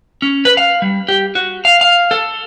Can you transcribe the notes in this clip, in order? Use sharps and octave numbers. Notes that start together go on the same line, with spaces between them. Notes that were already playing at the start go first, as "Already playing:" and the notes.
C#4
B4
F5
G3
G4
F#4
F5
F5
A4